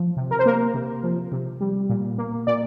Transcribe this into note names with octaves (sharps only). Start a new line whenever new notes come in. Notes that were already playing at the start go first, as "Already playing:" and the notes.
Already playing: F3
C3
A#4
C5
A#3 A#4
C3
F3
C3
G3
A#2
A#3
A#2 D5